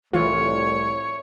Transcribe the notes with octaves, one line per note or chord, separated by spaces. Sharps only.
C2 A2 E3 F4 C#5